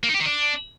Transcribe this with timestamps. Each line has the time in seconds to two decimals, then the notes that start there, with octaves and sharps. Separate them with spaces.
0.03 A#3
0.09 D#4
0.14 G4
0.20 D#3
0.26 D4